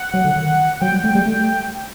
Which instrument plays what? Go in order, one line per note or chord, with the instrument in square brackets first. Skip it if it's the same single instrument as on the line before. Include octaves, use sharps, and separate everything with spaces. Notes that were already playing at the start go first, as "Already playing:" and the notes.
Already playing: [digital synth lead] F#5
[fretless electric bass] F#3
D3
D#3
[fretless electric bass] F#3 [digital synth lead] G5
[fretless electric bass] G3
A3
G3
A3